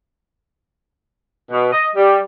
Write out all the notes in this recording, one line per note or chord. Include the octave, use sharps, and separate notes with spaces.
B2
D#5
G3